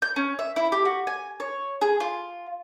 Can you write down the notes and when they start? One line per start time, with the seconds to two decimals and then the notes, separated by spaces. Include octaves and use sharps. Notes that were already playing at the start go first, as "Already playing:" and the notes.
0.02 G6
0.16 C#4
0.39 E5
0.56 E4
0.72 G4
0.85 F#4
1.07 G#5
1.40 C#5
1.81 G#4
2.00 F4